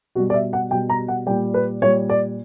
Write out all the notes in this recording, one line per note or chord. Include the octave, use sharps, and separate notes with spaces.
B2 G3 F#4
D5
E5
F#5
B2 G3 G5
A#5
F#5
A#2 G3 G5
B4
A#2 G3 C#5
D5